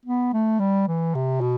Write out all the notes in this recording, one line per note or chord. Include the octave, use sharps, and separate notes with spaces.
B3
A3
G3
E3
C3
B2